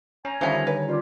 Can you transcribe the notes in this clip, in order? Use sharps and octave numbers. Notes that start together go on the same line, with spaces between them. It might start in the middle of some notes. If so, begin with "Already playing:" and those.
C#4 G#5 A#5
D3 D#3 F3 G3 C#4 E5 B5
B4 C#5
C#4 F4 G4 D5